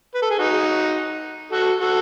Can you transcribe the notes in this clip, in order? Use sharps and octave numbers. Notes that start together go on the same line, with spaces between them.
B4
A4
G#4
D#4 F#4
F#4 A4
F#4 A4